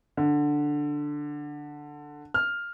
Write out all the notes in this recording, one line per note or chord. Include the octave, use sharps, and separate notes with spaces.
D3
F6